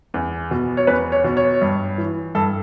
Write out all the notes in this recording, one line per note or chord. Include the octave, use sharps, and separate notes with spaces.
E2
B2
C#5
E2 B4
C#5
B2
C#5
G2
E3
G2 A4